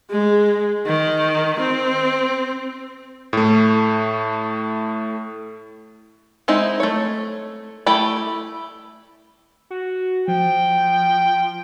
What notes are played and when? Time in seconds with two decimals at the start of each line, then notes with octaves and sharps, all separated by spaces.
0.10 G#3
0.86 D#3
1.60 C4
3.33 A2 A3
6.48 G#3 C4 D#4 E4
6.80 A3 C#5
7.86 A3 E4 G4 B5
9.70 F#4
10.28 F3 G5